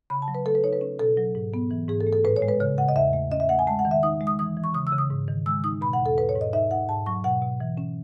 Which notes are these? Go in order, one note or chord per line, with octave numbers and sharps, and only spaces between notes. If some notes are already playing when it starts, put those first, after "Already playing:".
C#3 B5
A5
F#3
B4
A3 A4
B4
D#4 C#5
B4
C#4
B2 A4
F#3
G#2
B3
E3
G#2 G#4
A4
A3
A4
A2 B4
C#5
G#3
B4
C#3 C#5
C#3 F#5
D#5
E2 E5
A3
C#4 D#5
E5
A3 F#5
G#5
G#3 A5
F#5
D#3
E5
D#4 D#6
G#3
D#6
E3 D#6
E3
C#6
C#3 D#6
E6
C#3
D#6
G#2
D#3
G#3 E6
D#4 D#6
B2 B5
F#5
E2
A4
G#2 B4
C#5
G#2
D#5
D#4 E5
D#4 F#5
G#2 A5
F#3 C#6
B2 F#5
B2
E3
C#4